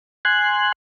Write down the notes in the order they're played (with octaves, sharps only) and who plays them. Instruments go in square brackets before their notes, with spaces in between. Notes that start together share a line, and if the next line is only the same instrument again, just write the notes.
[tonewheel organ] G#5 C6 F#6